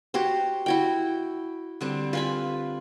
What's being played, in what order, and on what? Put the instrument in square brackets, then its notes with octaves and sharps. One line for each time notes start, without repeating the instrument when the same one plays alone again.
[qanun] F#4 G4 C5
E4 F#4 G5
[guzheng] D3 G3 C4
[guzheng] F4 [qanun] B4 G#5 B5